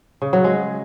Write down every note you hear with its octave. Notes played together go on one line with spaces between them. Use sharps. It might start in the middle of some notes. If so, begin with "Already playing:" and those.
C#3
F#3
G#3